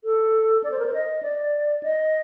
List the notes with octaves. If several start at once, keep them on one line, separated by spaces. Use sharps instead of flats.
A4
D5
C5
A#4
C5
D#5
D5
D#5